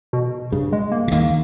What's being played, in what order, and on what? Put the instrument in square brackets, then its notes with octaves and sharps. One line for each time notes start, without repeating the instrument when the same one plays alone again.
[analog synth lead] B2
[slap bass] G2 [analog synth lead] C#3
[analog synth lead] G#3
A#3
[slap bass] C#3
[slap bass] D#2 D#3 [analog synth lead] A#3